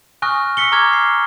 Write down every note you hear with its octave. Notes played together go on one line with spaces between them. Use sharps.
G#5 C#6 D#6 F6 F#6 A#6
C#6 E6 A#6 B6 C#7 G7
A#5 C#6 D6 F6 G#6
C7